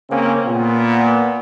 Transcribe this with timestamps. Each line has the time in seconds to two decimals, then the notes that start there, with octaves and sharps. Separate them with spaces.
0.10 C#3 A#3 C4 C#4
0.46 A#2 B3